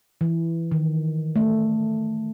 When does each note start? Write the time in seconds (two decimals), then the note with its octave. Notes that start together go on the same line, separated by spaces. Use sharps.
0.21 E3
0.71 D#3
1.36 A3